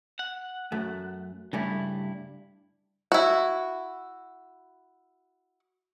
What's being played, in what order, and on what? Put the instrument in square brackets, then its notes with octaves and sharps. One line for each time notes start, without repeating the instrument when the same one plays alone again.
[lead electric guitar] F#5
[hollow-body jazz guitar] F#2 A3
[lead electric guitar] G2 E4 [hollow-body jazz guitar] C#3 G3 A3
[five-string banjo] E4 F#4